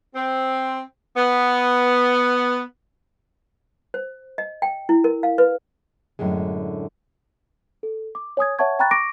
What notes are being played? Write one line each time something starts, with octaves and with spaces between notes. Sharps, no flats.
C4
B3
C5
D#5
G5
E4
A#4
F5
B4
F#2 A2 D3 G#3
A4
D6
C#5 G#5 D#6 G#6
C#5 E5 F#5 A5 C#6 G#6
G5 A#5 B5 C#6 F#6 A6
C#6 D6 A#6 D7